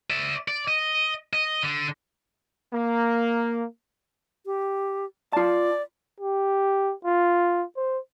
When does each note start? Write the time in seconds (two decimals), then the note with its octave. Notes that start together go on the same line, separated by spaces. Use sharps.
0.10 D5 E5
0.48 D5
0.68 D#5
1.33 D#5
1.63 D3
2.74 A#3
4.46 G4
5.33 F4 D5 A5
6.20 G4
7.05 F4
7.76 C5